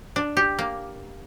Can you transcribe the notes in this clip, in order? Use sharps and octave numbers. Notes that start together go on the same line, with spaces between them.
D4
G4
A#3